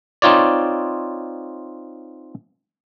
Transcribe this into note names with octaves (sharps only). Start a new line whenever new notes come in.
C4 D#4 F4 C#5 D5